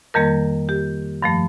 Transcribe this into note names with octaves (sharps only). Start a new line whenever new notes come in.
F2 D#3 G3 A#3 A#4
G4
G2 F3 A3